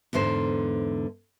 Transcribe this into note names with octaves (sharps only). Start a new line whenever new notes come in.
E2 G#2 D3 C5